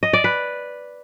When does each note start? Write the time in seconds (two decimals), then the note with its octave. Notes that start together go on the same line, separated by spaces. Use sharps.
0.03 D#5
0.13 D5
0.24 B4